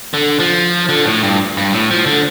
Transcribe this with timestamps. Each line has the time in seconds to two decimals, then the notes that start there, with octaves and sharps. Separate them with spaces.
0.14 D3
0.40 F3
0.89 D3
1.06 A2
1.23 G2
1.57 G2
1.73 A2
1.91 F3
2.06 D3